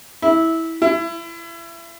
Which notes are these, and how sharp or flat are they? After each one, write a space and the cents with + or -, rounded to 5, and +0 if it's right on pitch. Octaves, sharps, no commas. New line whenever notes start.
E4 -15
E4 +30